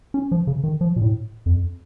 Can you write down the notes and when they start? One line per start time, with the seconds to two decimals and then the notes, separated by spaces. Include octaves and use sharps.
0.14 C#4
0.31 F3
0.47 C#3
0.64 D#3
0.81 F3
0.96 A#2
1.02 A2
1.46 F2